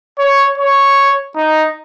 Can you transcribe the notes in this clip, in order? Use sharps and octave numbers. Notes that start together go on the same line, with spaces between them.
C#5
C#5
D#4